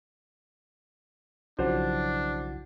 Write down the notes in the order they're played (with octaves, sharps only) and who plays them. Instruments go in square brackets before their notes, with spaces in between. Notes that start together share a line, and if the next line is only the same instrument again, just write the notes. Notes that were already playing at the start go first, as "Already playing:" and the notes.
[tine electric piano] B1 E4 F#5 [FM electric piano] C#3 F3 F#3 [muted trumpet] D4 [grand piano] C5